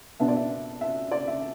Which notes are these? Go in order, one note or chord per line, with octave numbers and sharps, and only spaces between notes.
B2 B3 D4 E5
D5
E5
E5
D5
E5